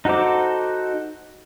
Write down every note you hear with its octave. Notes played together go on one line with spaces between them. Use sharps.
D#4 F#4 A4 C5 D6